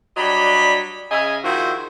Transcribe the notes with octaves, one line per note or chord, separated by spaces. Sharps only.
F#3 G3 D4 D#5 B5
C#3 D#5 E5 G#5
D#3 F3 E4 F#4 G#4 C5